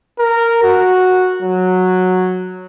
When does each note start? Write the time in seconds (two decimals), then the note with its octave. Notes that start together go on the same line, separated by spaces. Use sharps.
0.19 A#4
0.63 F#4
1.42 F#3